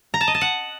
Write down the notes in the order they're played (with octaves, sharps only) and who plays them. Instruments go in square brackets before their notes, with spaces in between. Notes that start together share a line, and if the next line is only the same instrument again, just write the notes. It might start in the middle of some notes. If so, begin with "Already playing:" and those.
[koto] A#5
A5
D#5
A5
F#5